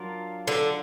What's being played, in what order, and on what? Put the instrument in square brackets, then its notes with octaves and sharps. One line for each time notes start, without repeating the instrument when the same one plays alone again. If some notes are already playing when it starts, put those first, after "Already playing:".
Already playing: [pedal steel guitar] F#3 D4 F4 A#4
[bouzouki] D3